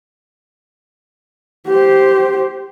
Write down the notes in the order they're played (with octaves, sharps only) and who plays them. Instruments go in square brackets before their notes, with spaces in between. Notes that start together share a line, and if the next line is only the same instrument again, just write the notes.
[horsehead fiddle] G4 C5